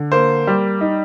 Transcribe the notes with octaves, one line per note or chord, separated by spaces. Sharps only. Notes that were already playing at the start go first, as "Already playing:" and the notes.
Already playing: D3
A#3 C5
G3
D#4